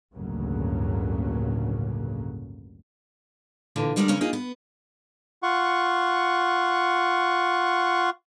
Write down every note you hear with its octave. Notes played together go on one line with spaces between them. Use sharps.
A1 D2 G2 C#3 F#3 A#3
A#2 D3 E3
D3 G3 G#3 D4 A4 A#4
F#2 C#3 C#4 A#4
A#3 D#4 F4 G#4
B3
F4 F#5 C#6